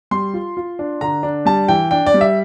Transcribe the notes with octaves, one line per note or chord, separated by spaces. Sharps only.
G3 C6
F4
F4
D4
D3 A#5
D4
G3 A5
E3 G5
D4 G5
D5
G3
E5